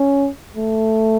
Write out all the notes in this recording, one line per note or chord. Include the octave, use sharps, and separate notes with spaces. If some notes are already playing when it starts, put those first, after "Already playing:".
Already playing: C#4
A3